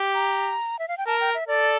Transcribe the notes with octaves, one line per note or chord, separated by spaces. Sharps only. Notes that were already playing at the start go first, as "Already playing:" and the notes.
Already playing: G4
A#5
E5
F5
G5
A#4 A5
G5
E5
A4 D5